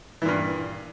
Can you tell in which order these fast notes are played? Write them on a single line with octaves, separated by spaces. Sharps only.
E3 A#2 G2